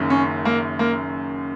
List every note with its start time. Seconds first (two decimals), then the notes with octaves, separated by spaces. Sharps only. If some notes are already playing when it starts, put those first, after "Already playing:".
Already playing: F#1 F#2 D#3
0.10 C#4
0.45 A#3
0.79 A#3